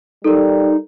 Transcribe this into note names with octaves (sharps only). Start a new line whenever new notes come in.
G3 D#4 A4 A#4